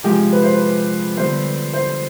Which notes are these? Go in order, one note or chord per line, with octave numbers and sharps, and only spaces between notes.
C3 F3 G#3 C4 F4 G4
B4
C5
B4
D3 G3 B3 C5
C5